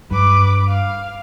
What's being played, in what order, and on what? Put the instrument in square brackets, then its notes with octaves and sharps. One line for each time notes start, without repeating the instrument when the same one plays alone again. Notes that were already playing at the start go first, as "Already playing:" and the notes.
[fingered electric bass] G2 [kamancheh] B4 D6
[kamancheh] F5